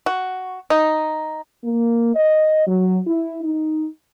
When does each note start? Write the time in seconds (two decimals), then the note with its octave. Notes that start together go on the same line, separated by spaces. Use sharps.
0.06 F#4
0.70 D#4
1.64 A#3
2.15 D#5
2.67 F#3
3.06 E4
3.44 D#4